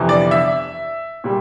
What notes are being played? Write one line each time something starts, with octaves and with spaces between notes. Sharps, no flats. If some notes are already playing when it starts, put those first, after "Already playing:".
Already playing: G1 F2 C3 E3
D5
E5
A#2 G3